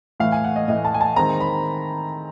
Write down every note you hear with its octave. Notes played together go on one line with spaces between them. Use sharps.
A2 E3 A3 F5
G#5
F#5
D#5
A2 E3 A3 D#5
A5
G#5
A5
D#3 G#3 C4 A#5
B5